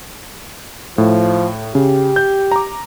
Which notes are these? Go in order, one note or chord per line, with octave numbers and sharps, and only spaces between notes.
A2 F3
C#3 G4
G6
A#5 D6